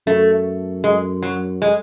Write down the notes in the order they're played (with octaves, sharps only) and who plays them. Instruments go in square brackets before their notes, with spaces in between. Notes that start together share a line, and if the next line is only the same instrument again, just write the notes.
[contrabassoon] F#2 [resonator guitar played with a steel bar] A3
[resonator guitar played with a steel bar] G#3
F#3
G#3